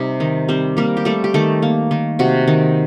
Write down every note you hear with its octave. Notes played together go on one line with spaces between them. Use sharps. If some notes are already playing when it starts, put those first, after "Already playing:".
Already playing: C3 G3 D#4
D#3
G3 C4 C5
G3 A#3 A#4
G4
G3 A3 A4
G4
D#3 A3 A4
A#3
D#3
C3 F#4
D#3